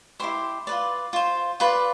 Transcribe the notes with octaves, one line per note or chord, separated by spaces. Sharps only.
E4 G4 C5 C6
F4 B4 D5
F4 C5
F4 B4 D5